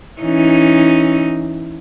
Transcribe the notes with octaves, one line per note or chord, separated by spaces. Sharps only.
E3 C#4 D#4